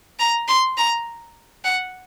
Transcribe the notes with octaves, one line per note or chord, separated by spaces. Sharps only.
A#5
C6
A#5
F#5